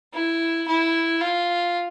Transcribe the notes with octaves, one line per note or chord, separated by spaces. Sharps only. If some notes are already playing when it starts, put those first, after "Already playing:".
E4
E4
F4